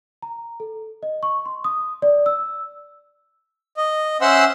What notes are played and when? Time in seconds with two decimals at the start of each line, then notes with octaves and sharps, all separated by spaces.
0.22 A#5
0.60 A4
1.03 D#5
1.23 C#6
1.45 C6
1.64 D#6
2.02 D5
2.26 E6
3.77 D#5
4.21 C#4 C5 E5 F#5 C6 E6